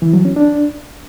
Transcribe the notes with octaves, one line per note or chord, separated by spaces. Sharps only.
E3
F#3
C#4
D4